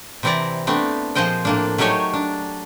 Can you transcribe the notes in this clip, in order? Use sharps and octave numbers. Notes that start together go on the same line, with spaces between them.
C3 E3 C4 E4 D5 A#5
A3 B3 C4 D4
A#2 F3 G#4 C5 D#5 G5
A2 A#3 D4
F#3 A3 D#4 G4 C#5 G#5
D4